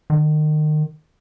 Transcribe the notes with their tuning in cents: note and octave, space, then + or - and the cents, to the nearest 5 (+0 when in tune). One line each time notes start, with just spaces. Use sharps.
D#3 -30